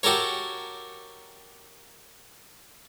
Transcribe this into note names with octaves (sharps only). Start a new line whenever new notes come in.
F#4 G4 A4 A#4 C#5